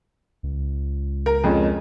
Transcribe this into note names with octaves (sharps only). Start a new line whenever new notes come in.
C#2
A#4
F2 G#3 C#4